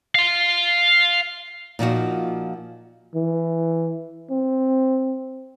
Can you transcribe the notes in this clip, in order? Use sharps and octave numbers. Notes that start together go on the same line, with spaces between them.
F5 C6
A#2 F3 D#4 F#4
E3
C4